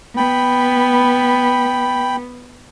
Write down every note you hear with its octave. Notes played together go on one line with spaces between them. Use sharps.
B3 G5 B5